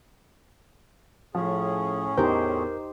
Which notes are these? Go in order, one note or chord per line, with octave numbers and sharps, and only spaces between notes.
A2 F3 C#4 G#4
E2 D#4 G4 A#4 C5 G6